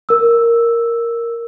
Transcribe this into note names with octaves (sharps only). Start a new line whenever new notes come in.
A#4 E6